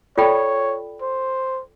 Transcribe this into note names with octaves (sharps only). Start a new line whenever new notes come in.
F4 A4 C#5 D5 G5 B5
C5